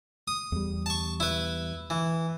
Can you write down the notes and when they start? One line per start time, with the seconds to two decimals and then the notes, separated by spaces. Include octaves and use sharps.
0.28 D#6
0.52 E2 G3
0.86 A5 C#6
1.20 E4 B4
1.90 E3